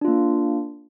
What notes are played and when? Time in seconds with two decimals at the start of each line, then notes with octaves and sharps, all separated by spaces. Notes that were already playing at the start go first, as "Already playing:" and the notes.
0.01 D4
0.05 F4
0.08 A#3